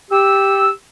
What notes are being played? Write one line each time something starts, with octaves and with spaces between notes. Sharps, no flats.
G4 E6